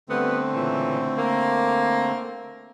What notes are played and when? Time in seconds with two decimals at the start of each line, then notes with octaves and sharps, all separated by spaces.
0.09 D3 G3 A3 B3 C4
0.52 A#2 C#3 E3
1.18 A#3